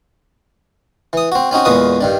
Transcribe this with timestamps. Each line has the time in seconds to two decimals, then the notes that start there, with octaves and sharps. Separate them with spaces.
1.13 E3 D#6
1.32 C4 F#4
1.51 C4 C#4 D#4 F#4
1.65 E2 A#2 G#3 F#4 B4 D#6
2.01 G2 D#3 D4